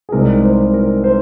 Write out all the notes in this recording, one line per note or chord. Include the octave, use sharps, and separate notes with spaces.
G#4
C2 C3 D#3 G#3 A#4
C5
A#4
C5